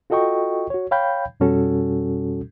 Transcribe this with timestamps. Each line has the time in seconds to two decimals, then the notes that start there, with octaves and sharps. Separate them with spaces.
0.10 F4 F#4 A4 D#5 G5 C#6
0.70 F#4 C#5
0.91 C#5 F5 G5 B5 G6
1.40 F2 B2 G3 C#4 F#4 A4